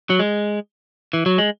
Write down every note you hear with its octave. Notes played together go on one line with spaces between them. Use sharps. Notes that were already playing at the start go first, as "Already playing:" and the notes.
F#3
G#3
E3
F#3
G#3